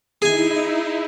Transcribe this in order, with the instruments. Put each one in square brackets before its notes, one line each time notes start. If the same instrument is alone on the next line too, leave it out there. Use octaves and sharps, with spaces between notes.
[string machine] D#4 E4 [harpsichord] G#4 G#5